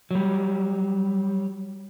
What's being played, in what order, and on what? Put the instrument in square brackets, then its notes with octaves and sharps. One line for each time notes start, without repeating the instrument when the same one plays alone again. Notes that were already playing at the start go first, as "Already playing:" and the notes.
[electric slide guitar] F#3 G3